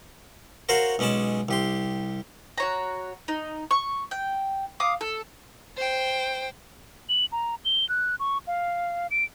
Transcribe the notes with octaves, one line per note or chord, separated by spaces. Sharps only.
F#4 A#4 C5 C#5 F5 F#5
B1 G#3 C#4 D5 A5
C2 G4 C6
F#4 C#5 A#5
D#4
C#6
G5
F5 D6 D#6
A4
C5 G5
F#7
A#5
G7
F#6
C#6
F5
D7